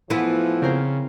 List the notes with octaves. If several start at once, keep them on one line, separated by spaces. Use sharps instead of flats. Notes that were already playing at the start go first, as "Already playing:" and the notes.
A2 E3 F3 B3 E4
C#3 C4 A#4 C5